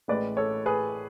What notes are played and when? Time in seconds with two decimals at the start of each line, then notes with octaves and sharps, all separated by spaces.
0.08 A1 A2 G#3 B4 D5
0.37 A4 C#5
0.66 G#4 B4